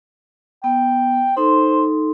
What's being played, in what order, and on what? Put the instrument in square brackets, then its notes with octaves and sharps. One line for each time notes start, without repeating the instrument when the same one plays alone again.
[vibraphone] B3 [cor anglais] G5
[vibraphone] D#4 A4 C6 [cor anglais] C5